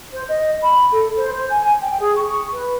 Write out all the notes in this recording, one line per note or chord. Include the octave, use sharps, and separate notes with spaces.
C5
D#5
B5
A4
C5
C5
G#5
G5
G#4
C#6
B4